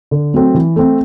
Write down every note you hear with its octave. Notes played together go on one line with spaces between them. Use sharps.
D3
F#3 A3 C4
E3
A3 C4